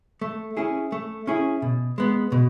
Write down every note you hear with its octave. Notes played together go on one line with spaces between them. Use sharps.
A3
C#4 E4 G#4
A3
C#4 E4 G#4
B2
G#3 B3
B2